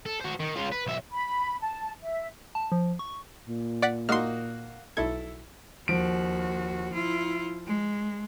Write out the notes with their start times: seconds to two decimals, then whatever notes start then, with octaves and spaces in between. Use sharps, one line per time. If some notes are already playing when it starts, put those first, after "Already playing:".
0.06 A4
0.21 F#4 C5
0.40 D#3
0.55 C#3 F4
0.72 B4
0.86 B1 E5
1.12 B5
1.61 A5
2.03 E5
2.55 A5
2.72 F3
2.99 C#6
3.47 A#2
3.82 D5 F#5 B6
4.09 A#3 D#4 F#4 C6 F6
4.97 B1 E4 A4 G#6
5.88 D#2 F3 F#4 D7
6.93 E4 F4
7.66 G#3